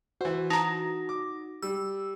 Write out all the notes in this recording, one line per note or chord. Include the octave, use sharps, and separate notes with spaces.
E3 F#4 C5
D#4 A5 A#5
D6
G3 E6